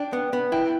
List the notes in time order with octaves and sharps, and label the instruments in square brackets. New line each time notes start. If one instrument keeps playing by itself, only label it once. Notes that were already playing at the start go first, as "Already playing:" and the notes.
Already playing: [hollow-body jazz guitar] D4 [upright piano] G5
[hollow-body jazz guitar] B3
B3
[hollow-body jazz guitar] E4 [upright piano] G5